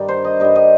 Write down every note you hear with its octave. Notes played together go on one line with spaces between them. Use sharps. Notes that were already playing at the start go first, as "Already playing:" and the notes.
Already playing: G2 D#3 G3
C5
D#5
G2 D#3 G3 D#5
D#5